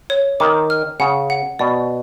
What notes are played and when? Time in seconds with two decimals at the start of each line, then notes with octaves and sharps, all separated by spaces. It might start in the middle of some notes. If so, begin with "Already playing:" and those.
0.10 C#5
0.40 D#3 D6
0.70 F6
1.00 C#3 F#5
1.30 F#5
1.59 B2 D5